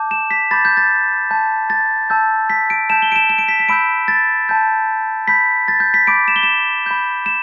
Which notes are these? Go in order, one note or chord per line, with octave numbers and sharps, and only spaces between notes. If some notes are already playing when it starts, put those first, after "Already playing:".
Already playing: A5 D6 G6
E7
B6
B5 D6 G6 A6
G6
A6
A5 G6
A6
A5 E6 G6
B6
D7
A5 G6 E7
G7
D7
E7
E7
D7
B6
B6
B5 E6 G6 D7
A6
A5 G6
B5 G6 B6
A6
G6
B6
B5 D6 G6 D7
E7
G7
E7
B5 G6
E7